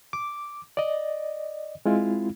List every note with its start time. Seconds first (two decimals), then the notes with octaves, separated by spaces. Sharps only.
0.13 D6
0.77 D5 D#5
1.86 G#3 C4 E4 F4